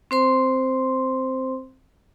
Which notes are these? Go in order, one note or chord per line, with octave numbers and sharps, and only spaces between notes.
C4 C5 C6